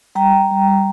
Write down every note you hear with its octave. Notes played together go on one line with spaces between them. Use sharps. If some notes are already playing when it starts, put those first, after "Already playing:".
G3 G5 A#5
G3
G3
G3